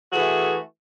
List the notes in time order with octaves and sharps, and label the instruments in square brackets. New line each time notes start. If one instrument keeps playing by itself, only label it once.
[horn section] E3 A3 F#4 G#4